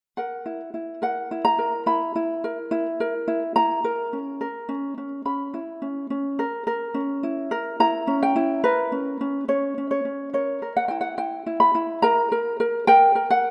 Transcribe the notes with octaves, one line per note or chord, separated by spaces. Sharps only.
A#4 F#5
E4
E4
A#4 F#5
E4
A#5
A#4
E4 B5
E4
A#4
E4
A#4
E4
E4 A#5
A#4
C#4
A#4
C#4
C#4
C#4 B5
E4
C#4
C#4
A#4
A#4
C#4
E4
A#4
E4 A#5
C#4
G5
E4
A#4 B4
C#4
C#4
C#4 C#5
C#4
C#5
C#4
A#4 C#5
A#4
F#5
E4 G5
F#5
E4 G5
E4
B5
E4
A#4 A#5
A#4
A#4
A#4 G5
A#4
F#5